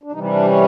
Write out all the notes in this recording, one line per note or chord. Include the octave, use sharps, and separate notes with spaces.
D4
C3 E3 G3 D#4
D#4
D4
C#4